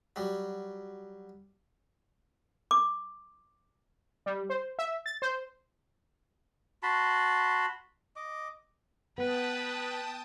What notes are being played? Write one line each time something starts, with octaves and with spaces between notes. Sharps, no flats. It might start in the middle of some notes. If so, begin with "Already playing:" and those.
F#3 G3
D6
G3
C5
E5
A6
C5
F#4 A5 B5 C6
D#5 D6
B3 B4 G5 A5 D#6